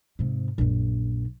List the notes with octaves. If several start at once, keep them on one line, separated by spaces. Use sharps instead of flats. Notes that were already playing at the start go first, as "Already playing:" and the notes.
G#2 C3
A#1 F#2